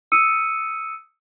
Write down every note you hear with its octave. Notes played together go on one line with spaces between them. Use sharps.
D#6 E6 C#7 D#7